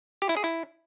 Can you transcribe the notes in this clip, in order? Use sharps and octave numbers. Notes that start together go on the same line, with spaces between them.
G4
E4
G#4
E4